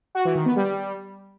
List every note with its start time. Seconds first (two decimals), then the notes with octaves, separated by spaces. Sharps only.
0.15 F#4
0.25 E3
0.35 D#3
0.46 B3
0.56 G3